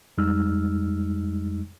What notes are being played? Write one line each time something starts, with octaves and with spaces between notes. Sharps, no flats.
F2 G3 G#3 D#4 E6 F6